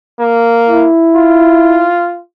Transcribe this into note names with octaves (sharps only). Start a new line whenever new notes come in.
A#3
E4
F4